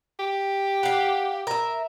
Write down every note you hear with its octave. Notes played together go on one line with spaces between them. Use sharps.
G4
F5 F#5
A#4 E5